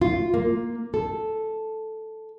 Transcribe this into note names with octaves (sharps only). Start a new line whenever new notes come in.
F4
A#3
A4